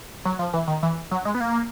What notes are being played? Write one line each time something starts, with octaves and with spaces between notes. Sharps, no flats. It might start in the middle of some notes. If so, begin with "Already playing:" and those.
F#3
F3
E3
D#3
E3
F#3
G#3
B3
A#3